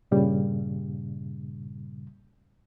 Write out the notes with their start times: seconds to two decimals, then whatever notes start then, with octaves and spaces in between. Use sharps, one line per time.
0.11 G2 A#2 C#3 G3